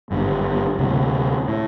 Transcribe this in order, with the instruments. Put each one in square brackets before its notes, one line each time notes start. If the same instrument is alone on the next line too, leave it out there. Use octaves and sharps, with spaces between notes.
[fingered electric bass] G#1 G2 D3
D2 C3
A2